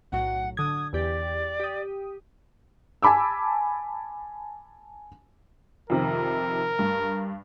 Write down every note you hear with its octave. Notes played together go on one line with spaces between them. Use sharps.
B1 A2 F#3 F#5
D3 D#6 G#6
E2 G4 D5
G4 D#6
G#5 A5 B5 D6 E6
F2 C3 D#3 A#4
G2